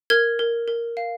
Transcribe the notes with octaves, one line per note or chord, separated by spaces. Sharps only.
A#4 F6 G#6
A#4
A#4
F5